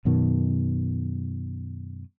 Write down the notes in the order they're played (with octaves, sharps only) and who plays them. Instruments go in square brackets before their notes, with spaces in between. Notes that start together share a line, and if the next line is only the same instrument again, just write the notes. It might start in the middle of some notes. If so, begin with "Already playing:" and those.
[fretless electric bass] F#2 B2 D#3